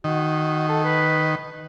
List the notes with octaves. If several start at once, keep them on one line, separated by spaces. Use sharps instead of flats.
D#3 F#4
A4
B4